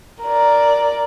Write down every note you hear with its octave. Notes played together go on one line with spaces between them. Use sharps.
A#4 D5